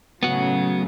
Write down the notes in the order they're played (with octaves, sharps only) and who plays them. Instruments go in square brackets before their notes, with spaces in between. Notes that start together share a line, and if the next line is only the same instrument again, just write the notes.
[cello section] A2 C#3 F#3 [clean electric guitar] B3 F#4